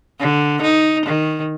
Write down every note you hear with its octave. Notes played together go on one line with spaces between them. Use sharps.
D3
D#4
D#3